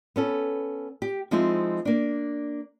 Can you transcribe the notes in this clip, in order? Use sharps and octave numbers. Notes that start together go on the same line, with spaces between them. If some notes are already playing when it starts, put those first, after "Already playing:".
B3 C#4 A4
G4
F3 G#3 C4 D#4 E4 C5
A#3 D4